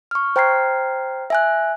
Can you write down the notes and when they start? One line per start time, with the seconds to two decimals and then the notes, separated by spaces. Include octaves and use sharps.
0.11 C#6 F6
0.36 C5 G5 A#5 F6 G#6 C7
1.30 E5 G#5 F#6